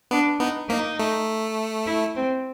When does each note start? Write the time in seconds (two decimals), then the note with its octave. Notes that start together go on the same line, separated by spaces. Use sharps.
0.11 B3 D4
0.40 B3 D#4
0.69 A#3 D#4
0.99 A3
1.86 E4
2.16 C4